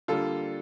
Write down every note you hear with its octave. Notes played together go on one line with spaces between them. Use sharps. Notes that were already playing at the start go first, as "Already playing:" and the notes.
D3 G3 A#3 F4 A4